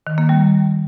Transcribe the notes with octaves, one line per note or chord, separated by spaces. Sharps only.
D#3
A#3
G3